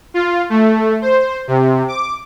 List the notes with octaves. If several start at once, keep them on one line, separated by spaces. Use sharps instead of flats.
F4
A3
C5
C3
D6